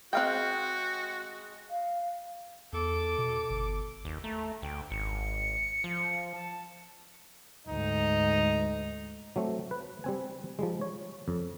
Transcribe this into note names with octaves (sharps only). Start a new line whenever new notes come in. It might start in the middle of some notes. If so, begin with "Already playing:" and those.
G#3 C4 F#4 F5 G5
F5
E2 A4 D6
B2
G1
D#2
A3 A#5
D2 G5
G#1 C#7
F3
A5
D2 G#2 D#4
F#3 A3 C4
B4
G3 C4 G#5
F3 G3 G#3
C#5
F2